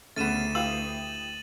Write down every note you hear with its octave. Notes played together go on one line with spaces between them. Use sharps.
D2 C#3 A3 B3 C#4 A6 D#7 E7
E4 G4 B4 F5 D#6 F#7